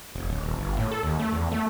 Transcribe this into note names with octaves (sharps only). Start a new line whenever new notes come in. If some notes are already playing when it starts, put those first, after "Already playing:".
F1
D1
D#1
G1
A2
A4
D#2
A3
E2
A3